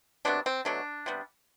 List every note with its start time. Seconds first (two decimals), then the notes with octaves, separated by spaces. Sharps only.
0.25 C3 F#3 B3 D4
0.46 C4
0.65 B2 F#3 A3 D4
1.06 C3 G3 B3